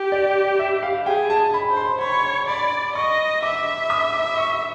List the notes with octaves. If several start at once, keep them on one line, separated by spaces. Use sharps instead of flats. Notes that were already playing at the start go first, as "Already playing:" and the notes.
Already playing: G4
D5
E5
F5
G#4 G5
A5
B5
C5
C6
C#5 B5
D5 B5
D#5 C#6
E5 D6
D#6
D6
C#6